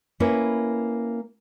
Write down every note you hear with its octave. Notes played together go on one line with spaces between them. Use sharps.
A#3 C#4 E4 B4